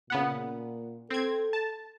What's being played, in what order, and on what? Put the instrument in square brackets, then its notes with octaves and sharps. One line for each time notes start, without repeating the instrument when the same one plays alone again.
[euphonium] A#2 [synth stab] C#3 B3 F#5
[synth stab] C4 G#6 [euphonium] A4
[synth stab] A5